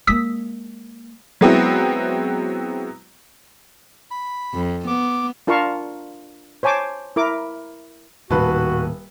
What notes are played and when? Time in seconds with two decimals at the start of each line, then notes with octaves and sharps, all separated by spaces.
0.07 G#3 A#3 D#6 E6 B6
1.41 F#3 G#3 B3 C4 E4 F#4
4.11 B5
4.54 F2
4.87 B3 D6
5.47 D4 F4 A#4 F5 A5 C#6
6.63 C5 C#5 G#5 A5 D6
7.16 E4 A#4 D6
8.31 D#1 A2 D#3 A#3 F#4 B4 A5